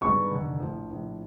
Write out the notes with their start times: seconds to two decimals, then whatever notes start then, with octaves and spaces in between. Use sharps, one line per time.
0.01 G2 D#3 G#3 B3 C#6
0.31 F1 D#2 D3
0.60 A#1 A2 F3
0.90 A#1 A2 F3